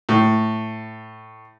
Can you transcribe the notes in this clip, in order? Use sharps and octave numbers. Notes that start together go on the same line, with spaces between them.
A2